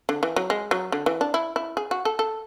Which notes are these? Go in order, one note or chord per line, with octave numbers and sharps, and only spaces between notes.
D3
E3
F#3
G#3
F#3
D3
E3
D4
E4
E4
G#4
F#4
A4
A4